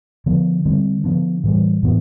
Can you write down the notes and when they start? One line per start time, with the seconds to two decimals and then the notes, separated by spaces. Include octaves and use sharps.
0.26 D3 F3 B3
0.65 D3 G3 C4
1.04 D3 F3 B3 D4
1.44 A2 E3 G3
1.83 A2 E3 B3